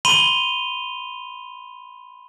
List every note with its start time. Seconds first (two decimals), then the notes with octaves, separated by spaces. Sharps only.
0.05 B5 C6 D#7 F7 G7